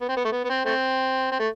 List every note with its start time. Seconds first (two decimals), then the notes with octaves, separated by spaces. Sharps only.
0.01 B3
0.09 C4
0.17 B3
0.25 A3
0.32 B3
0.44 B3
0.49 C4
0.65 A3 C4
1.32 C4
1.39 A3